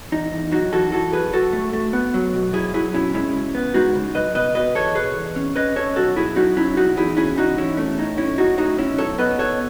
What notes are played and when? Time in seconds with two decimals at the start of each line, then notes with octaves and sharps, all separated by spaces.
0.12 E2 D#4
0.32 E2
0.52 F#3 D#4 F#4
0.72 E3 F#4 A4
0.92 E3 F#4 A4
1.12 F#2 G#4 B4
1.33 F#2 F#4 A4
1.53 A3
1.73 A3
1.93 B3
2.14 F#3
2.33 B2
2.53 F#3 E4 G#4
2.74 F#3 E4 G#4
2.94 B2 C#4 E4
3.13 G#3 C#4 E4
3.34 C#3
3.55 B3
3.74 G#3 D#4 F#4
3.95 C#3
4.15 F#2 B4 D#5
4.35 B2 B4 D#5
4.55 B2 B4 D#5
4.75 E2 A4 C#5
4.95 B2 G#4 B4
5.16 E2
5.36 C#4
5.56 C#4 B4 D#5
5.76 C#4 A4 C#5
5.96 B1 F#4 A4
6.16 B1 E4 G#4
6.36 F#3 D#4 F#4
6.57 F#3 C#4 E4
6.77 B2 D#4 F#4
6.97 E2 E4 G#4
7.17 C#4 E4 G#4
7.37 E2 D#4 F#4
7.57 E2 C#4 E4
7.77 A3 C#4
7.98 A2 D#4
8.18 B1 C#4 E4
8.38 A2 D#4 F#4
8.58 A2 D#4 F#4
8.78 B1 C#4 E4
8.98 B1 A4 C#5
9.18 B3 B4 D#5
9.39 B3 A4 C#5